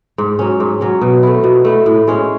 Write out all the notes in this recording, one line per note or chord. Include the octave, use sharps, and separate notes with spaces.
G#2
F#3 C#4
G#2
F#3 C#4
B2
A3 E4
B2
A3 E4
A2
G#3 C#4